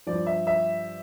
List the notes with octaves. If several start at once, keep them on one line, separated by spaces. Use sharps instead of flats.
G2 F3 D5
E5
E5